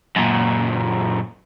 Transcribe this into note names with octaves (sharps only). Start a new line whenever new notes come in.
F#2 A#2